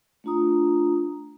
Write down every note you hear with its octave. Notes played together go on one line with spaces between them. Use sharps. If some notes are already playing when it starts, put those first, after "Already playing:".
A3 D4 F4 A#5 D#6